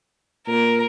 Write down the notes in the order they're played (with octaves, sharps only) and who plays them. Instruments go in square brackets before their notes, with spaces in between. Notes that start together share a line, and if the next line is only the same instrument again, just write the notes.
[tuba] A#2 [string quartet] A#4